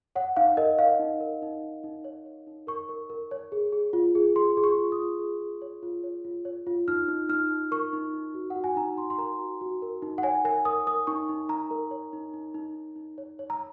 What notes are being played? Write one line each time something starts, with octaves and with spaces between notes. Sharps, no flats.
C#5 F#5
D#4 F5
A#4 D#5
A#4 F5
D#4
A#4
D#4
D#4
D#4
C#5
C#5
D#4
A#4 C#6
A#4
A#4
C#5
G#4
G#4
F4
G#4
G#4 C6
G#4
C#6
F4
D#6
F4
G#4
G#4
C#5
F4
C#5
F4
C#5
F4
D#4 F6
D#4
D#4 F6
D#4
A#4 C#6
D#4
D#4
F#4
F#5
F#4
G#5
D#4 A#5
D#4 C6
C6
A#4 A#5
F#4
F#4
A#4
D#4
F#5
C#5 G#5
A#4 G#5
A#4 D#6
A#4 D#6
D#4 C#6
D#4
D#4 A#5
A#4
C#5
D#4
D#4
D#4
D#4
D#4
C#5
C#5
A#5